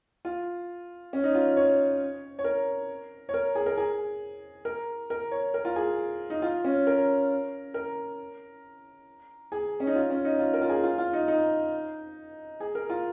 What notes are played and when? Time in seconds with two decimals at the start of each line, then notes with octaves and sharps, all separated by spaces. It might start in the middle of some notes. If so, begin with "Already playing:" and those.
0.25 F4
1.13 C#4
1.24 D#4
1.35 F4
1.57 C#5
2.39 C#5
2.44 A#4
3.29 C#5
3.34 A#4
3.55 G#4
3.66 A#4
3.77 G#4
4.65 A#4
5.10 A#4
5.32 C#5
5.54 A#4
5.65 F4
5.76 G#4
6.30 D#4
6.42 F4
6.64 C#4
6.87 A#4
7.74 A#4
9.52 G#4
9.80 C#4
9.87 D#4
9.95 F4
10.10 C#4
10.25 D#4
10.39 F4
10.54 A#4
10.62 F4
10.69 G#4
10.83 F4
10.98 F4
11.13 D#4
11.28 D#4
12.60 G#4
12.75 A#4
12.90 F4